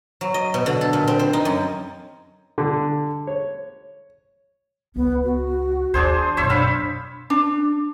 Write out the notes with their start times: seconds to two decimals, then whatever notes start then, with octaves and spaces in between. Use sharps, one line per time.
0.21 F#3
0.34 D#5
0.54 B2
0.66 D3
0.81 A4
0.93 A#2
1.08 C4
1.19 C5
1.33 D#4
1.45 F#2
2.58 D3
3.27 C#5
4.96 C#2 B3
5.24 F#4
5.94 D#2 D4 G#4 C5
6.37 F#2 B2 C5 C#5 E5
6.50 D4 F5 B5
7.30 D4